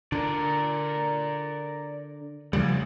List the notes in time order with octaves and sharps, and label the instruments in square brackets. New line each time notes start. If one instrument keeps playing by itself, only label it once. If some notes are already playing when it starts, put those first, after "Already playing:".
[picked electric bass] D3 [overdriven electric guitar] A#4 D5
[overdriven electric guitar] D2 [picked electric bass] C#3 F3 G3